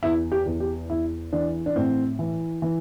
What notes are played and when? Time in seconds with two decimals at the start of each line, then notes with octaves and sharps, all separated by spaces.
0.03 E2 E4
0.32 G4
0.46 E2
0.60 G4
0.89 E2 E4
1.33 E3 D4
1.66 D4
1.76 A2 C4
2.19 E3
2.62 E3